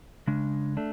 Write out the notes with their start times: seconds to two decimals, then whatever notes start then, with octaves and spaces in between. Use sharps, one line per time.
0.27 C#3 G#3 D4
0.77 A3 D4